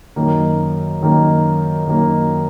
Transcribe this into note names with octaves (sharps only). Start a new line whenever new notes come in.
F#2 D#3 A#3
F#2 D#3 A#3
F#2 D#3 A#3